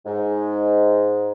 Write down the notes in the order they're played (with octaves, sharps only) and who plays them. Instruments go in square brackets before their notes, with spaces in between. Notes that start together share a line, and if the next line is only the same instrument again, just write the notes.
[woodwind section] G#2